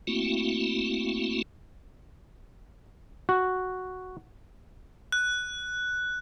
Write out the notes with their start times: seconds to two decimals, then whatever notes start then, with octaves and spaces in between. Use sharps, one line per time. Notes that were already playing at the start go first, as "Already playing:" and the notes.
0.07 A3 A#3 C4 E4 F#4
3.29 F#4
5.12 F#6